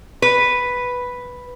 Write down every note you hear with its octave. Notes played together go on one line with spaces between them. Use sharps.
B4